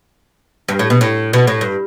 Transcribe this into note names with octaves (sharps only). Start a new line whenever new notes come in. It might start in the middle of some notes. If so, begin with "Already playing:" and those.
G2
A2
B2
A2
B2
A2
G2